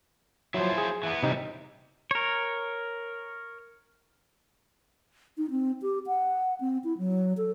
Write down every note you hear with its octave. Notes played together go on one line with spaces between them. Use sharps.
F3 F#3 E4 F4 C5
G#4
E3 B3
C3 E3 G3 D#4
A#4 C#5
D#4
C4
G4
F#5
C4
E4
F#3
A4